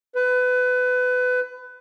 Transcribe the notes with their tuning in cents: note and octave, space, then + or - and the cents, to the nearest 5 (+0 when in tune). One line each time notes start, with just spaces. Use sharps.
B4 +25